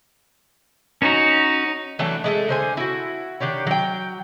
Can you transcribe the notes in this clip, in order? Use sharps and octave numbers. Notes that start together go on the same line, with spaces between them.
C#4 D#4 F#4
E3 F#3 A3 D4
G#3 A3 A4
D3 C5 G#5
E4 F#4
D#3 D4 G4 C#5
F#3 G5